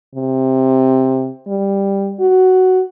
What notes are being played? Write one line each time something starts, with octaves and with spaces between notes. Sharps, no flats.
C3
G3
F#4